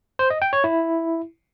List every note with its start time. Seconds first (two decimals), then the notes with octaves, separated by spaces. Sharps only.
0.19 C5
0.30 D#5
0.42 G5
0.53 C#5
0.64 E4